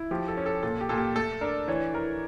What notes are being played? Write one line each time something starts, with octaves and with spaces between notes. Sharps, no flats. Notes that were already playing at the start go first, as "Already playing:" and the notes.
Already playing: E4
F3 G4
A4
C#4
A4
A#2 A4
G4
A#2 A4
G4
A3 A4
D4 A#4
E3 C#5
E3 A#4